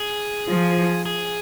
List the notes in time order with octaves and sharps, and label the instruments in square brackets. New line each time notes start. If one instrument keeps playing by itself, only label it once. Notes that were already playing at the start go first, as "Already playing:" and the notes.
Already playing: [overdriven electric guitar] G#4
[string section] F3
[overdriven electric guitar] G#4